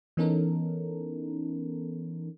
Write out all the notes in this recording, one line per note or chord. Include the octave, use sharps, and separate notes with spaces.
E3 B3 C#4 D#4 A4 A#4